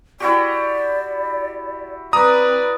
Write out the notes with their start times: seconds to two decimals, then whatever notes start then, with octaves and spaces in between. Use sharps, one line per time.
0.20 E4 F#4 G4 D5
2.13 C4 B4 D5 A#5 D#6